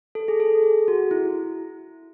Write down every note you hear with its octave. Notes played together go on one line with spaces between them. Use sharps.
A4
G#4
A4
G#4
F#4
E4